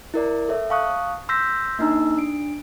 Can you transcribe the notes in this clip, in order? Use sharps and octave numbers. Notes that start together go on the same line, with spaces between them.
E4 A#4 D5
A4 C#5 E5
F5 A5 C#6 D#6 F#6
C6 E6 G6 A#6 B6
A#3 D4 D#4 A#5 E6
D4 D7